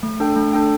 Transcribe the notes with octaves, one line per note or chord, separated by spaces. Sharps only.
A3
D4 A4 G5
A3
D4 A4 G5